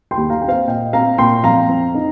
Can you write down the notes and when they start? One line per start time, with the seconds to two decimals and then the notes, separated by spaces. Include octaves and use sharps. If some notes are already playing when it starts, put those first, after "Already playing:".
0.11 G5 C6
0.17 D#2
0.30 F5 A#5
0.41 C4 G5
0.48 C5 F5
0.68 A#2 D#5 G5
0.93 C4 F5 A#5
1.18 A#2 G5 C6
1.44 F2 F5 A#5
1.69 C4
1.94 D#4